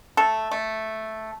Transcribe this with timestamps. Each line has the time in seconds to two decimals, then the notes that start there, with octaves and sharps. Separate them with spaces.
0.17 A3 A4
0.51 A3